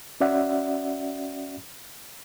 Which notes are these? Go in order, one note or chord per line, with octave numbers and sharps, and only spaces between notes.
C#4 F#4 D5 E5 F#5